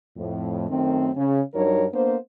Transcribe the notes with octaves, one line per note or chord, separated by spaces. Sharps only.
F2 A2
F#2 D#3 A3 C4
C#3
G2 F#3 D#4 A#4 C#5
A#3 B3 D4 C5